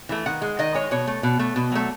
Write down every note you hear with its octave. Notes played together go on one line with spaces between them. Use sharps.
E3 A3
D#3 F#5
G#3
D#3 D#5
G#3 C#5
B2 C#5
A3
B2
A3
B2
F#3 A3